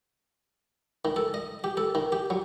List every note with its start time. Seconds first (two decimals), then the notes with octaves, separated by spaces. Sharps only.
1.05 D#3
1.16 A4
1.34 D#5
1.64 G4
1.77 A4
1.95 D#3
2.12 G4
2.30 F#3